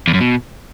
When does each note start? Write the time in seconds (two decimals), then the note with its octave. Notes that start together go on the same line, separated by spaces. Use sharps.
0.08 E2
0.14 F#2
0.21 B2